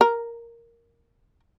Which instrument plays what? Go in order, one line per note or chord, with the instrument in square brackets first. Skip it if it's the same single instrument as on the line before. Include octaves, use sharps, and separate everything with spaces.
[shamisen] A#4